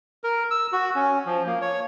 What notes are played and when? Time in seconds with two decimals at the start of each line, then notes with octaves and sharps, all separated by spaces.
0.24 A#4
0.51 E6
0.72 F#4
0.95 C#4
1.26 F3
1.46 A#3
1.62 C#5